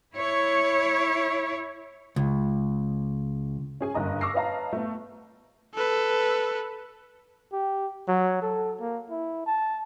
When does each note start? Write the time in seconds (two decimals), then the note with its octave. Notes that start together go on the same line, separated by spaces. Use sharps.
0.14 E4 C#5
2.16 C#2
3.81 C#4 G#4 G#5
3.94 F#1 G2 D3 D#5 A#5
4.21 C#6 D6 E6 F6 A#6 C7
4.34 B4 C#5 D#5 F5 A5 A#5
4.73 A3 B3
5.74 A4 B4
7.53 G4
8.08 F#3
8.42 A4
8.80 A#3
9.11 E4
9.47 A5